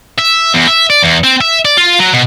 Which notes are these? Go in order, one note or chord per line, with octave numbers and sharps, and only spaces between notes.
E5
E2
E5
D5
E2
C4
E5
D5
F4
F#3
B2